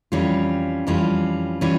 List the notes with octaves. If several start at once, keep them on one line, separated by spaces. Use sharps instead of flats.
F2 E3 G3 C#4 F4
F2 E3 G3 C#4 F4
E3 G3 C#4 F4